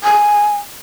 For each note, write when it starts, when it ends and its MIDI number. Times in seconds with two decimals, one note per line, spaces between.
0.04 0.54 80